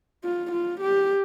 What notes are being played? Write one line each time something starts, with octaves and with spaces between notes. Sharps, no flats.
F4
F4
G4